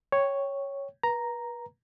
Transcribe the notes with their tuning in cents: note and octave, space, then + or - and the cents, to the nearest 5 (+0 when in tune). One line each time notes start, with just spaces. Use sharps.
C#5 +0 G5 +0
B4 -35 A#5 +0